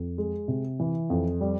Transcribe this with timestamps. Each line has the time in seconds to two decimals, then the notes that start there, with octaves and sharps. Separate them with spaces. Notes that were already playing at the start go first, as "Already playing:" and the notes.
Already playing: F2
0.18 G#3
0.48 C3
0.80 E3
1.10 F2
1.41 G3